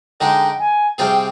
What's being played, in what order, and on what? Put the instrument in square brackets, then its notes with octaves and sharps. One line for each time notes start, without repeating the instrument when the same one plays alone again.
[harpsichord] D3 G#3 D#4 G#4 [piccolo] G5
[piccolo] G#5
[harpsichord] C3 G3 C4 F4 G#4 [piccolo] G5